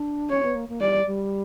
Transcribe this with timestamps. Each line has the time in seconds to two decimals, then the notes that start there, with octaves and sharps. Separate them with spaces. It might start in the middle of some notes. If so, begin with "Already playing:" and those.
Already playing: D4
0.30 C#4 C#5
0.43 B3
0.55 A#3
0.69 A#3
0.81 G3 D5
1.06 G3